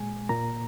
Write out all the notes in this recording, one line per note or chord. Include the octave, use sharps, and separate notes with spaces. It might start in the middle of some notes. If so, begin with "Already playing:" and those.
Already playing: A#2 G#3 G#5
A#2 A#3 A#5